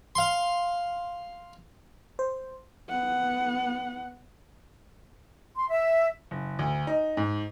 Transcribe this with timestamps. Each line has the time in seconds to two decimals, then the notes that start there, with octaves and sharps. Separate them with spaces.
0.15 F5 C6
2.19 C5
2.89 B3 F#5
5.56 C6
5.70 E5
6.31 F#1
6.59 D2
6.87 D#4
7.17 G#2